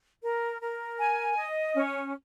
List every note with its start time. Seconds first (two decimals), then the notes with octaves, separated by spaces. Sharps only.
0.23 A#4
0.61 A#4
0.98 G#5
1.36 D#5
1.74 C#4